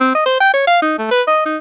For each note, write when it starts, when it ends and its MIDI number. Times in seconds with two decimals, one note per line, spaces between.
0.01 0.14 60
0.15 0.26 75
0.26 0.38 72
0.41 0.54 79
0.54 0.63 73
0.67 0.81 77
0.82 0.97 63
0.99 1.07 57
1.11 1.22 71
1.27 1.41 75
1.46 1.57 63